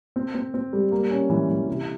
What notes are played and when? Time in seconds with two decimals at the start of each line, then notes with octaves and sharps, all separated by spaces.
0.16 C4
0.35 C4
0.54 C4
0.73 G3
0.92 A#3
1.10 C#4
1.30 E3
1.49 E3
1.68 C3